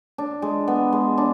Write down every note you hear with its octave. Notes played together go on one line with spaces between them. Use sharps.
D4
G#3
B3
G#3
D4